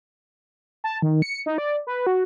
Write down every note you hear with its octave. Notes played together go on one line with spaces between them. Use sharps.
A5
D#3
C#7
D#4
D5
B4
F#4